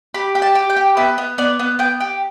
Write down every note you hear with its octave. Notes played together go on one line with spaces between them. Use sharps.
G4 B5
G4
A5
G4
G5
G4
B3 E5
B3
B3 D5
B3
B3 G5
G4